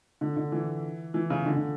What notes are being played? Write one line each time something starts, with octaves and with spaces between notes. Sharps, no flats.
D3
D3
E3
E3
C#3
D3
D3